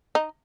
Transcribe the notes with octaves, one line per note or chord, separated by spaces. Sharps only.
D#4